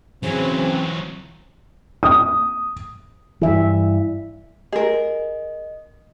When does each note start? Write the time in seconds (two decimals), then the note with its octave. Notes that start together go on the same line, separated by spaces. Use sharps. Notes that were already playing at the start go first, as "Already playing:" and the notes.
0.23 C#3 E3 F#3 C4 C5
2.03 D#6
3.42 G2 E3 E4 E5
4.73 G#4 A#4 D#5